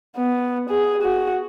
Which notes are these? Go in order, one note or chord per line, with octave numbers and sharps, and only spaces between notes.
B3
G#4
F#4